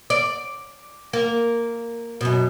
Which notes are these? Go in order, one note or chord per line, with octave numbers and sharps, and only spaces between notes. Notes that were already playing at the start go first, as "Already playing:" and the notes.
D5
A#3
F#2 B2